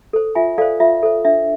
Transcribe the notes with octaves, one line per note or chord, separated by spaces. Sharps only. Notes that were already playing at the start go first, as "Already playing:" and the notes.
A4 C5
F4 E5 G#5
A4 C5 D5 F5
F4 E5
A4 C5
D4 E5